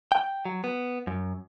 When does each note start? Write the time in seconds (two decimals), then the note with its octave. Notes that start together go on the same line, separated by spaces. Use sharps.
0.12 G5
0.45 F#3
0.64 B3
1.07 F#2